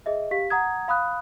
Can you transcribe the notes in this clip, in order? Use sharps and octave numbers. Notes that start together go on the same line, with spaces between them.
G#4 D#5 E5
G4 F5 B6
F#5 A#5 D#6 G#6
F5 B5 D#6 F#6